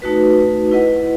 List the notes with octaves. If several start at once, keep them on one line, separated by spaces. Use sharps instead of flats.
A3 D#4 F#4 B4
E4 B4 D#5 F#5